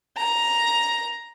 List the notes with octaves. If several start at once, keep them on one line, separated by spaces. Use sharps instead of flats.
A#5